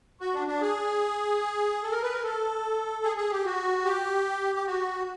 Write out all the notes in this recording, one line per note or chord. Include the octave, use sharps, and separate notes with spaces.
F#4
D4
D4
G#4
A4
A#4
B4
A#4
A4
G#4
G#4
G4
F#4
G4
G4
F#4